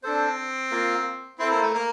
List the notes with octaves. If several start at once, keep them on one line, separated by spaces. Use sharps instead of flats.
C4 D4 A4 C5
A#3 F4 A#4 F5
C4 E4 A4 C5
A#3
A3
A#3